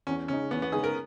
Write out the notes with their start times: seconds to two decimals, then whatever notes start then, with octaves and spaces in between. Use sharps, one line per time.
0.07 E2 C#4
0.28 C#3 G#3 C#4 D#4
0.51 E2 B3
0.62 B3
0.72 C#3 G#3 D#4 G#4
0.84 A#4